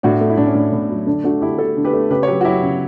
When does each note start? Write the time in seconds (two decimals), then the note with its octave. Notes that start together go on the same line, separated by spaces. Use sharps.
0.03 A2 D4 F#4
0.21 A3
0.30 E4
0.37 A2 D4
0.47 C#4
0.55 A2 D4
0.72 A2
0.90 F#3
1.06 D3 D4
1.24 A3 D4 F#4
1.41 D3 E4 G4
1.58 A3 F#4 A4
1.77 D3
1.84 G4 B4
1.93 A3
2.10 C#3 G4 B4
2.23 C#5
2.27 F#3 G4 B4
2.41 F#4
2.45 F#3 E4 G4
2.62 C#3